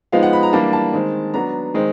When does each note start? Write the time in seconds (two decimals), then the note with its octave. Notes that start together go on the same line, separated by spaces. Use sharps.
0.12 F3 G#3 B3 D#4 F5
0.23 F#5
0.33 B5
0.43 A#5
0.53 E3 G3 A#3 D4 A5
0.73 A5
0.93 D#3 G#3 C4
1.34 F#3 B3 D4 A#5
1.74 D#3 G#3 C4